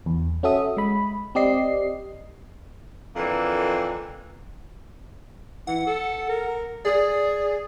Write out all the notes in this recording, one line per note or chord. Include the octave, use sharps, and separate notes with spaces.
E2
C#4 F#4 A4 E5 D#6
G#3 B5
C4 G4 D5 D#5 C7
F2 D3 E3 A#3
E3 F#5
A4
A#4
G#4 D5